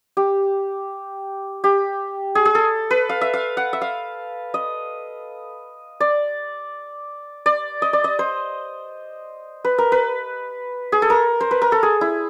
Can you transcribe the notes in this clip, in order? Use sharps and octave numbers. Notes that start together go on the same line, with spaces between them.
G4
G4
G#4
G#4
A4
B4
F5
E5
F5
F#5
E5
F5
D#5
D5
D5
D#5
D5
D#5
C5
B4
A#4
B4
G#4
A4
A#4
C5
B4
A#4
A4
G#4
E4